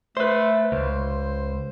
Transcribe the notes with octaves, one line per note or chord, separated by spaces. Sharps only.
A3 B4 C5
C#2 C5